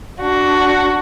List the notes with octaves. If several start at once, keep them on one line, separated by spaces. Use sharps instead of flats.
D4 F#4